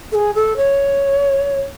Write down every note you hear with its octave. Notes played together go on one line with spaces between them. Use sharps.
A4
G#4
A4
C#5